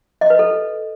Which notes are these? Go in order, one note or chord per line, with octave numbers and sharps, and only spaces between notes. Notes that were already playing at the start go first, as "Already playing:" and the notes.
D#5
B4
A4